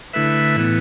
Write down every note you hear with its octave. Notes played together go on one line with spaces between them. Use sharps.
D3 A3 E4 B4 E5
A2 E3 B3